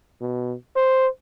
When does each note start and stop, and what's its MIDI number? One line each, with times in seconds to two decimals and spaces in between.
0.21 0.54 47
0.76 1.07 72